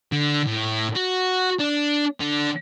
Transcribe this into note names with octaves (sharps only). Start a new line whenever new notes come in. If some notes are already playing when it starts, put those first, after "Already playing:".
D3
A2
F#4
D4
D3